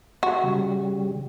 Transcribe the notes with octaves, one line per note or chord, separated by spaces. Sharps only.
F#4
C#3 G3